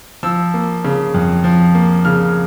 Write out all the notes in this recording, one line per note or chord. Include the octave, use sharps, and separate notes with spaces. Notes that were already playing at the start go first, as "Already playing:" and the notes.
F3 E6
A#3
C#3
F2
F3
A#3
C#3 F6